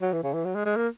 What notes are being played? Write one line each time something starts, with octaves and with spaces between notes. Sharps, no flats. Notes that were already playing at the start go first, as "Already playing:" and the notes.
F#3
E3
C#3
E3
F#3
G#3
G#3
A#3